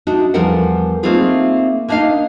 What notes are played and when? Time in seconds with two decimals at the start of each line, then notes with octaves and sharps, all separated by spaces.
0.07 D4 D#4 F#4
0.34 E2 F3 G3 A4 A#4 F#5
1.03 A3 A#3 C4 D#4 F4 G#4
1.88 A#3 D4 D#4 D#5 F5